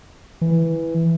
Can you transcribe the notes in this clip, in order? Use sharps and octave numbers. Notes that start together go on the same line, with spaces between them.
E3